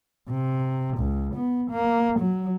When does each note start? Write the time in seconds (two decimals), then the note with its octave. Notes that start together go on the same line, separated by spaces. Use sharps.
0.30 C3
0.98 C#2
1.35 B3
1.71 A#3
2.20 F#3